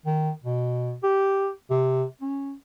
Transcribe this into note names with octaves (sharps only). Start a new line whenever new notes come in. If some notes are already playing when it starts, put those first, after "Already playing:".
D#3
B2
G4
C3
C#4